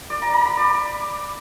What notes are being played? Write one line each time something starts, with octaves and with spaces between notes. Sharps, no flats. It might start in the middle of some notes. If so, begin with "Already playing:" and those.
D5
A#5
A#5
B5
D5